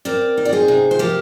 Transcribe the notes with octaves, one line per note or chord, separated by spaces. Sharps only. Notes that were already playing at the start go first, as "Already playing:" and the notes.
C4 A#4 D5
D#4
D5
G#4 C5
C3
C5
F3 G4 A#4